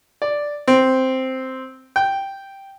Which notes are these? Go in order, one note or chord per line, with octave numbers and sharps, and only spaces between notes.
D5
C4
G5